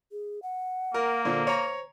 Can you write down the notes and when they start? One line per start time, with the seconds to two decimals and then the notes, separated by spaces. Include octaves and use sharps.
0.12 G#4
0.43 F#5
0.94 A#3 A#4
1.25 A#2 D3 C5
1.47 C#5 A#5